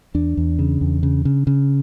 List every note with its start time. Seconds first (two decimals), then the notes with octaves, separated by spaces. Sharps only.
0.14 E2 D4
0.37 E2
0.59 C#3
0.81 E2
1.03 C#3
1.25 C#3
1.47 C#3